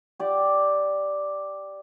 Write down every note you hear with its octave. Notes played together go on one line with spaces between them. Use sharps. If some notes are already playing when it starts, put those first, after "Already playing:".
G4 D5